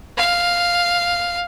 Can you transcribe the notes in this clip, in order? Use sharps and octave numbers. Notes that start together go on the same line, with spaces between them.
F5